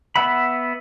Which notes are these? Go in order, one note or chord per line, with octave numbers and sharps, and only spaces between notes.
B3 E5 F#5 B5